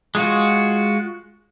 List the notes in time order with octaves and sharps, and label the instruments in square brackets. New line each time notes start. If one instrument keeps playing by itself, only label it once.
[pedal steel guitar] G#3 F4 F#4